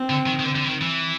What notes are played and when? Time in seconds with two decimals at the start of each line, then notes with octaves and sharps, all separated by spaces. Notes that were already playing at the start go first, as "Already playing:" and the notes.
Already playing: C4
0.10 D3
0.27 D#3
0.40 D#3
0.44 D3
0.56 D3
0.64 E3
0.69 D#3
0.81 E3